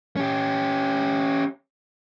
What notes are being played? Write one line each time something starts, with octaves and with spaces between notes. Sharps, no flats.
C#4 G4